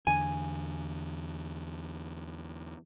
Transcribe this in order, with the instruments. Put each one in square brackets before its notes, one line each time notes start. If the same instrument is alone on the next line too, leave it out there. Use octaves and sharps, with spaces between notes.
[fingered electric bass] E2 D3 [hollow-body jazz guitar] G#5